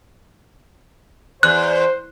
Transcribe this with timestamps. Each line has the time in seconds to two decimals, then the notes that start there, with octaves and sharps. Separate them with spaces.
1.43 E2 C5 F#6